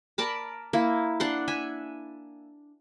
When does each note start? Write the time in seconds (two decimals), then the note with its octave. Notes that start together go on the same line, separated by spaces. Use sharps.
0.18 A#4 D5 A5 B5
0.73 A#3 E4
1.20 D4 F#5 C6
1.48 E5 G#5